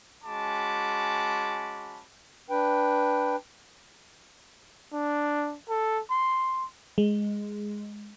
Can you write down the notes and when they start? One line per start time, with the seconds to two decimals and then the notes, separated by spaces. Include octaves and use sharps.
0.25 G#3 C#4 F#4 A5 B5 D6
2.50 D4 B4 G5
4.93 D4
5.69 A4
6.11 C6
6.98 G#3